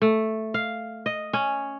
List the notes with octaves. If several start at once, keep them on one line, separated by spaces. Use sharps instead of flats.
A3
F5
D#5
C#4